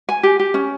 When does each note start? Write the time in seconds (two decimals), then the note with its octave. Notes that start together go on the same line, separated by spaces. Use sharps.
0.09 G#5
0.23 G4
0.40 G4
0.54 C#4